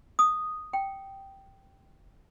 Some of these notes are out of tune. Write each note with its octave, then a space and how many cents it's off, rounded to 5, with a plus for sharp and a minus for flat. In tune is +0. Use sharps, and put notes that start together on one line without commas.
D#6 -5
G5 -5